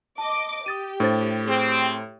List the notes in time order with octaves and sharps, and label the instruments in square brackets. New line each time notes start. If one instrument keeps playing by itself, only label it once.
[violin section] D#5 D6 [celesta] A5
[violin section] G4 [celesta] D#6 A6 D#7
[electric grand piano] A2 [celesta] D4 C5 A6
[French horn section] C4 [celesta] G#4